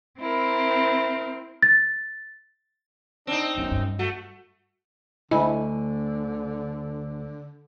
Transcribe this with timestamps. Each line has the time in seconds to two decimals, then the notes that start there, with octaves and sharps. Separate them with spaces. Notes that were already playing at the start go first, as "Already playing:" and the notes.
0.20 C4 E4 A#4
1.63 A6
3.27 C4 D4 D#4
3.57 F#2 B3 D4
3.71 G2
3.99 A3 F#4
5.31 D2 D3 E4 D#5 G#5